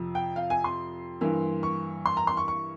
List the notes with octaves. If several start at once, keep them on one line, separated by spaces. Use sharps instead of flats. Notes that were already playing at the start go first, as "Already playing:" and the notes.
Already playing: F2 C3 F3
G5
F5
G#5
C6
G2 E3 A#3
C#6
C6
A#5
C6
C#6
C#6